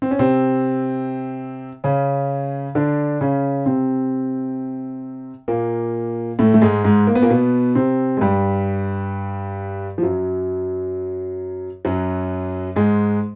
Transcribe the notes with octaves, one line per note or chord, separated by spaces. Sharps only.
C4
C#4
C3 C4
C#3 C#4
D3 D4
C#3 C#4
C3 C4
A#2 A#3
A2 A3
A3
G#2 G#3
G#2 G#3
A#3
B3
A#2 A#3
B2 B3
C3 C4
G#3
G2 G3
F3
F#2 F#3
F#2 F#3
G#2 G#3